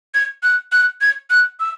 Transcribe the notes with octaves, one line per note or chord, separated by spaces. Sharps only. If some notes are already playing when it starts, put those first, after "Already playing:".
G#6
F#6
F#6
G#6
F#6
E6